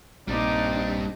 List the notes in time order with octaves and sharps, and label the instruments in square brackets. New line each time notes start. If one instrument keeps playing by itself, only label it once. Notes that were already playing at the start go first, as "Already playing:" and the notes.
[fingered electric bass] A#1 A#3 [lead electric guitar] G3 D4 [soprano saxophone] C4 [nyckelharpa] D#4 D6